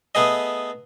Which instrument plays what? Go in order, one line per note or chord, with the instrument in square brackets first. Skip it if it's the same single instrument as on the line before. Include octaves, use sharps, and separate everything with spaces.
[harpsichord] A3 B3 G#4 D#5